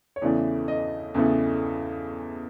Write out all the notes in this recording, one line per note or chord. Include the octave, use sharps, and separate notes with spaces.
C#5
E2 C#3 E3 A3 D5
D#5
E2 C#3 E3 A3